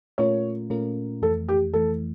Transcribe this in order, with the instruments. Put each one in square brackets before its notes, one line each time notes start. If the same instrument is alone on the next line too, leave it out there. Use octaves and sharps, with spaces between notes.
[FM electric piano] A#2 A3 C#4 F4 A#4 [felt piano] C#5
[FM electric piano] A#2 A3 C#4 F4 A#4
[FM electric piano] F2 E3 A3 [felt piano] A4
[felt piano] G4
[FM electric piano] F2 E3 A3 [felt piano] A4